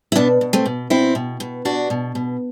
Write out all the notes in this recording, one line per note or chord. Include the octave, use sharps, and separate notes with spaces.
E4
B2 B3 D4
B2
A3 C4
B2
B2 C4 E4
B2
B2
B2 D4 F#4
B2
B2